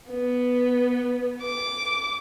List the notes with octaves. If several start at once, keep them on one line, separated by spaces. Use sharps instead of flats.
B3
D6